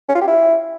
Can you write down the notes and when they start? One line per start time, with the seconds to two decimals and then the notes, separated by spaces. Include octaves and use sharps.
0.09 C#4
0.15 F4
0.21 G4
0.27 E4